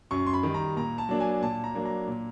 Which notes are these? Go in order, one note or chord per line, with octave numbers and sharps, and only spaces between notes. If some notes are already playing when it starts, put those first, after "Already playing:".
F#2 C#6
C6
B5
D#3 G3
A#5
A#2 A#5
A5
F#3 A#3 D4
G#5
A#2 A5
A#5
F#3 A#3 D4
A#5
A#2